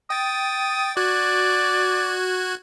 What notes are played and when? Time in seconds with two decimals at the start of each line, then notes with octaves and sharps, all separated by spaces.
0.10 G5 D#6 A6
0.97 F#4 D5 F#6 G#6